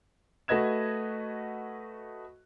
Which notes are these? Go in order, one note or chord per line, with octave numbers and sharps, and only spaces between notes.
A3 F#4 B4 D#5 G#6 E7